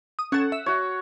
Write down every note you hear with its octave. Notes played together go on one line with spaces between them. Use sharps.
D#6
C#4 A4 F#5
E5
F#4 C#5